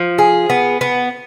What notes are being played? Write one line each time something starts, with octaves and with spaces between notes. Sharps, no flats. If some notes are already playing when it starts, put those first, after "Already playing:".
Already playing: F3
G#4
B3
B3